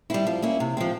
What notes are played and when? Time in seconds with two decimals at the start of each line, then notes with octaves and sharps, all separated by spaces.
0.10 G3 C4 E4
0.27 F3
0.42 A#3 C#4 E4
0.60 C3
0.77 F3 G#3 C4